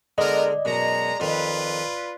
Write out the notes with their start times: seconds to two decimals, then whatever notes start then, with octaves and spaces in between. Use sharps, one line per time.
0.18 D3 G#3 B3 A#4 D5 D#5
0.65 F#2 B2 G#3 A#5
1.20 F2 D#3 F4 B4